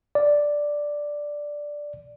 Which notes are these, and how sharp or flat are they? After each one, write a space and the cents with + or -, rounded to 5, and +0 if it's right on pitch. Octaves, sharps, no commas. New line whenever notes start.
D5 +0